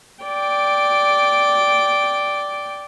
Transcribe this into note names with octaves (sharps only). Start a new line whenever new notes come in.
D5 G5